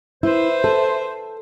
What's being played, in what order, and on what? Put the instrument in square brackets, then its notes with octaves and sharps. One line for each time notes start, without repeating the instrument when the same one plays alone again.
[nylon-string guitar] E4 [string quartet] B4 E5 [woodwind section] C5
[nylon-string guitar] A4